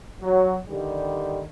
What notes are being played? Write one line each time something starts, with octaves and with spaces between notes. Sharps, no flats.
F#3
D3 D#3 G3